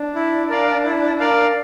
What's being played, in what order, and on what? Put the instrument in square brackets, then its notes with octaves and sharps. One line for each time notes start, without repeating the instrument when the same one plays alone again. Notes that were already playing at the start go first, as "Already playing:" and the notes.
Already playing: [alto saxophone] D4
[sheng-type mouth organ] E4
A#4 D5 F5
E4
A#4 D5 F5